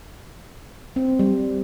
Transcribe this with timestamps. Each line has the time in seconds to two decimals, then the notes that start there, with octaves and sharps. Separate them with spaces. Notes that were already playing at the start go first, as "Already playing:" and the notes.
0.96 C4
1.19 G3